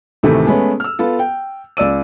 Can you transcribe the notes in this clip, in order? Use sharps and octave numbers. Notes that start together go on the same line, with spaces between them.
D2 A2 C3 D#3 E3 A3
G#3 A3 B3 C#4
E6 F6
B3 F4 A4
G5
C#2 D5 E6 D#7